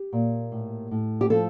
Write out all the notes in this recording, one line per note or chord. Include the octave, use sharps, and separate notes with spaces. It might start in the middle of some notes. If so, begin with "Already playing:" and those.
Already playing: G4
A#2
A2
A2
G4
F3 A4